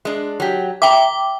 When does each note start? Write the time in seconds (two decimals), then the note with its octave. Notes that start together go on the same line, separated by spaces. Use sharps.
0.05 G#3 D4
0.40 F#3 G4
0.82 E5 G5 A#5 D6